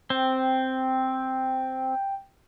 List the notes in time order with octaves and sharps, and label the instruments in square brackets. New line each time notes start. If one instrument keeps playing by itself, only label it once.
[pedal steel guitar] C4 [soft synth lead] G5